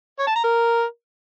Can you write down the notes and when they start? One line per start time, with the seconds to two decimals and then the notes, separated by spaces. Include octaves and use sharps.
0.19 C#5
0.27 A5
0.36 A#5
0.44 A#4